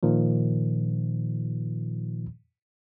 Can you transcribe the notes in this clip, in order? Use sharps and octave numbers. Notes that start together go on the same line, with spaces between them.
A#2 D#3 F3